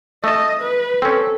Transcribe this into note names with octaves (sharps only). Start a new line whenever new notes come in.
A3 D#5 A5
B4
C4 C#4 A4